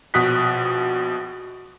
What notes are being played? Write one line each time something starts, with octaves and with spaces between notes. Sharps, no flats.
A#1 B2 D#6 F#6 B6